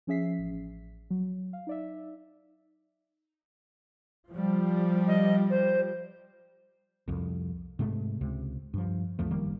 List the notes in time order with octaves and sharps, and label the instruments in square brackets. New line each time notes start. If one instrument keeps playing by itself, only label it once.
[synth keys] F3 C#4 G#4 E5 B6 C7
A1
F#3
F5
D#4 D5 E5
[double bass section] F3 G3
[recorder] D#5
C5
[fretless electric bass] C2 F2
G#2 C3 G#3 A3
C#2 C3
G2 F3
A1 E2 F3 A3
F#1 D#3 G3 A#3